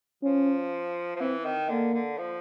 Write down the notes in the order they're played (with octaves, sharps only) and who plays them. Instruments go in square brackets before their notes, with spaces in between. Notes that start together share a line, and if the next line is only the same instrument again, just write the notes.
[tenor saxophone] F3 [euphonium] C#4
[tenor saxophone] F3
[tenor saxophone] E3 [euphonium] C4
[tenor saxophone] D#3
[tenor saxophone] D3 [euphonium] A#3
[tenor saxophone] D3
F3